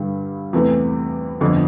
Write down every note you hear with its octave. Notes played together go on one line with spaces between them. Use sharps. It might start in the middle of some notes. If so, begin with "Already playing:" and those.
Already playing: G2 D3 G3
E2 C3 E3 A3
G1 F2 D3